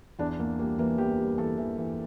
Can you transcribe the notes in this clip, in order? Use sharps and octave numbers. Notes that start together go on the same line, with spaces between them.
E2 D4
E2 A#3
G3 A#3
E3 A#3
E2 G4
G3
E3 A4
E3
E3